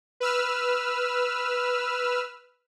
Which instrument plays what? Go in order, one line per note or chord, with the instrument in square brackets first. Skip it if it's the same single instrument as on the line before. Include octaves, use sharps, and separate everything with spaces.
[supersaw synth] B4 E6 F6